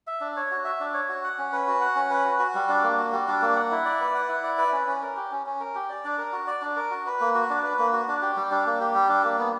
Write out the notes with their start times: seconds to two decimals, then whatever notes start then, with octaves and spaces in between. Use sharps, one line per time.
0.07 E5
0.21 D4
0.37 C#5
0.51 F#4
0.65 E5
0.80 D4
0.94 C#5
1.09 F#4
1.24 F#5
1.38 C#4
1.53 B4
1.68 F#4
1.81 F#5
1.96 C#4
2.10 B4
2.25 F#4
2.39 F#4
2.55 G3
2.69 D4
2.83 A#3
2.97 F#4
3.12 G3
3.28 D4
3.42 A#3
3.56 F#5
3.71 E4
3.85 D5
4.01 B4
4.15 F#5
4.29 E4
4.44 D5
4.58 B4
4.72 C#4
4.87 C#4
5.02 A#4
5.16 G4
5.31 C#4
5.46 C#4
5.60 A#4
5.75 G4
5.89 D5
6.04 D4
6.18 A#4
6.33 F#4
6.47 D5
6.62 D4
6.76 A#4
6.91 F#4
7.06 B4
7.21 A#3
7.35 F#4
7.50 D4
7.63 B4
7.79 A#3
7.93 F#4
8.08 D4
8.22 G4
8.37 G3
8.51 D4
8.66 A#3
8.80 G4
8.95 G3
9.09 D4
9.24 A#3
9.39 B3